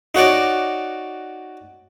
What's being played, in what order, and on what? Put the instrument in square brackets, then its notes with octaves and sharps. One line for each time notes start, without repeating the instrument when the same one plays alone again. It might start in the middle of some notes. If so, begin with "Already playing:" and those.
[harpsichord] D#4 F#4 C#5 D5